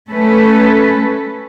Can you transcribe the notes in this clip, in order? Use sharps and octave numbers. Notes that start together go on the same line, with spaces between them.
A3 C#4 A4 B4